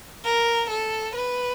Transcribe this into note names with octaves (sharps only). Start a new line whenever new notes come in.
A#4
A4
B4